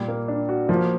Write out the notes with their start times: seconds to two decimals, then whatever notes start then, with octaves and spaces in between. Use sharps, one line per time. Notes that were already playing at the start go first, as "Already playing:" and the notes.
Already playing: A#2 G3
0.08 A#3
0.28 D4
0.49 F#4
0.69 F3 A#3